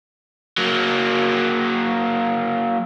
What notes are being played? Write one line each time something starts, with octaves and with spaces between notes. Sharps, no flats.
F#3 A#3